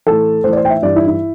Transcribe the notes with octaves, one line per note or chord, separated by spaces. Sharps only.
A2 E3 A4
A2 E3 C5 D5
C5
G5
E5
G2 E3 D5
E4
E4